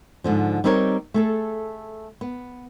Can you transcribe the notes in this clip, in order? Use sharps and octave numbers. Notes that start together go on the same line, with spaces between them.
G#2 D3 F3
G3 C4 D#4 E4 A#4 C#5
A3 G#4 A4
B3